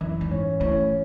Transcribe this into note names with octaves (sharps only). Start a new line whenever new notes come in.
F#2 E3
G#2
C#4
A2 C#4